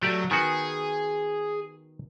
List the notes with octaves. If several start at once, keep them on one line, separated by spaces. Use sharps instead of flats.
F#3 A3 G4 D5
D#3 B3 F#4 G#4